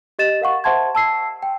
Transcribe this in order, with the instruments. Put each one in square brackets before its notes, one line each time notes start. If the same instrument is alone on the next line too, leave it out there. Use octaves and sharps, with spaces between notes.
[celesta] G4 D#5 A6 E7
A#4 F5 F#5 C#6
C5 E5 F#5 A5 C6 G#6
A5 E6 C7
G5